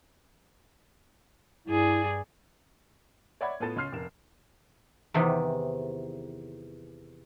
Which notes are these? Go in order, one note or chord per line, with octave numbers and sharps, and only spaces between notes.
G2 E4 G#4 D5
C#5 D5 E5 F#5 B5 G#6
A2 B3 F4 A4 A6 E7
C#2 C#4 C6 F6 C7
F1 A#4 E7
E2 C3 D#3 E3 G4 D#5